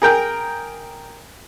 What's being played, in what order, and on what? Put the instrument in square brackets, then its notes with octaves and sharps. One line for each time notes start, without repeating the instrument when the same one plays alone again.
[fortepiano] G#4 A#4 G5